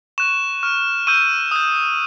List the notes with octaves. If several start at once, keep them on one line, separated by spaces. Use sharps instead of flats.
C#6 F#6 E7
C#6 F6
C#6 E6 G6 D#7
D#6 G6